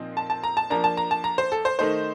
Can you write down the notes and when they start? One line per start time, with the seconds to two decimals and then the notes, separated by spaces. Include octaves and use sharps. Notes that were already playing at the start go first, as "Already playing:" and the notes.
Already playing: A#2 F3 C4 D#4
0.17 A5
0.30 A5
0.44 A#5
0.57 A5
0.70 F3 A#3 D4 A#5
0.84 A5
0.97 A#5
1.11 A5
1.24 A#5
1.38 C5
1.52 A4
1.65 C5
1.79 D#3 A3 D#4 C5